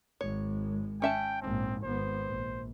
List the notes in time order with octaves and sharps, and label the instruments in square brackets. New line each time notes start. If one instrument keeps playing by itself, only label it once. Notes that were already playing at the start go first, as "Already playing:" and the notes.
[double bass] G#1 G#3 [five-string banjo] C#5
[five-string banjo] C#4 E5 A5 [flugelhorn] G5
[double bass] A#1 G#2 [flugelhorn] C4
[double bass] G#1 B3 [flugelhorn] C5
[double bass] A#1